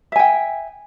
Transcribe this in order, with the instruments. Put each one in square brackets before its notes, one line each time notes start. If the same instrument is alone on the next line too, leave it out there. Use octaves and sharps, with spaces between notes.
[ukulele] E5
G#5
G5